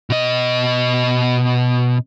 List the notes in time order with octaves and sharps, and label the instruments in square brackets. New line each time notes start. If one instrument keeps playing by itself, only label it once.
[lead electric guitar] B2 D#5